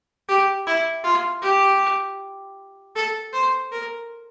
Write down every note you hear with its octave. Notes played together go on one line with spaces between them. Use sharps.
G4
E4
F4
G4
A4
C5
A#4